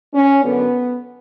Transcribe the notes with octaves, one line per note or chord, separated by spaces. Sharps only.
C#4
F#2 D3 F#3 B3